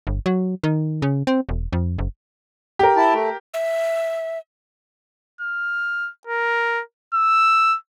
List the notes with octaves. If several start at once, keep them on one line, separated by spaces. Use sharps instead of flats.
G1
F#3
D#3
C#3
C4
E1
F2
F#1
G4 A#4
E4 A5
A3
E5
F6
A#4
E6